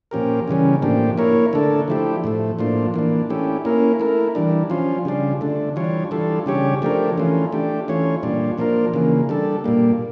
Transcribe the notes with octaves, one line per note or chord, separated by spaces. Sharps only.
A#2 F3 C#4 G4 A#4
C#3 E3 G3 C#4
A2 F3 A#3 D4 G4
A#3 E4 A#4 C#5
D3 A3 D4 A4
F3 A3 E4 G4
A2 F3 A3
A2 F3 A#3 D4 F4
E3 A#3 D4
A3 C#4 E4 G4
A#3 C#4 E4 A#4
A3 E4 A#4
E3 G3 D4
F3 C#4 F4
C#3 G3 D4 F4
D3 A3 D4
E3 G3 D4 F4 C#5
E3 G3 D4 F4 A4
C#3 G3 D4 G4 C#5
F3 A3 D4 G4 A#4
E3 A3 C#4 F4
A3 D4 G4
E3 A3 C#4 F4 C#5
A#2 G3 D4 F4
F3 A#3 D4 F4 A#4
C#3 E3 A#3
G3 D4 A4
A#2 G3 A#3